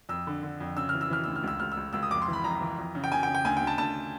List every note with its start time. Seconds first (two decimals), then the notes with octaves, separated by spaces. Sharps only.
0.09 F2 E6
0.27 D3
0.43 D3
0.60 F2
0.76 C#3 E6
0.89 E3 F6
1.01 E6
1.10 E3 F6
1.24 D2 E6
1.36 F6
1.44 C#2 E6
1.60 C#2 F6
1.72 E6
1.77 C#2
1.93 C#2 E6
2.03 D#6
2.11 F2 D6
2.22 C6
2.28 E3
2.33 B5
2.44 F2 A#5
2.61 E3
2.78 F2
2.95 C#3
3.04 G5
3.12 C#3 G#5
3.23 G5
3.28 C#3
3.34 G5
3.45 D2 G#5
3.57 D2 G5
3.67 A5
3.78 D2 A5